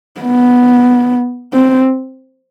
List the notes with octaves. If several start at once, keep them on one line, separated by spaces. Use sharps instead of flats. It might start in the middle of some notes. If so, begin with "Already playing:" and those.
B3
C4